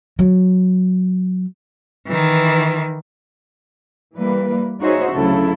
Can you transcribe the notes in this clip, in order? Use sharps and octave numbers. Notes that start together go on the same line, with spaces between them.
F#3
D#3 E3
E3 G3 A#3 B4
D#4 F#4 G#4 C5 C#5 E5
D2 C#3 F#3 E4 A4